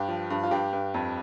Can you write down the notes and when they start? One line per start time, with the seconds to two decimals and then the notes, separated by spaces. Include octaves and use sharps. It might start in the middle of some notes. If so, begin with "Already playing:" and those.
Already playing: G2 G4
0.08 F3
0.30 G2
0.43 F4
0.51 G2 G4
0.73 G2
0.94 F2